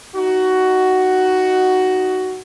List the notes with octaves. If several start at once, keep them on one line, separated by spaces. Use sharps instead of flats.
D#4 F#4